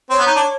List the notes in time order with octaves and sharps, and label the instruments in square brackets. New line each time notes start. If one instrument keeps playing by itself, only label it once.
[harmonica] C4 [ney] C#5
[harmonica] B3
D#4
D4